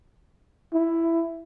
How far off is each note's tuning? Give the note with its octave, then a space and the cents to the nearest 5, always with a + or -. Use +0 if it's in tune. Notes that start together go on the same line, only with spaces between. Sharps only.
E4 +10